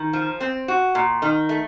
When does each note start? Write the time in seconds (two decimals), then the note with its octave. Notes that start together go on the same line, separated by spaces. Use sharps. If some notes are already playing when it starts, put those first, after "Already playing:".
Already playing: D#3
0.13 F3
0.40 C4
0.68 F#4
0.95 A#2
1.22 D#3
1.49 A3